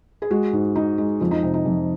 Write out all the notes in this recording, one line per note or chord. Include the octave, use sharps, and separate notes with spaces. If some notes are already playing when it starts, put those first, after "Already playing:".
G#4
G#3 F#4
G#2
G#2 D#4
G#3
F2 F4
D#4
C3
D#4
F2